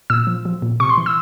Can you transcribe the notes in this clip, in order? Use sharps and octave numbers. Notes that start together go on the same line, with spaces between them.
A#2 E6
F3
F3
A#2
C3 C#6
C6
E3
E6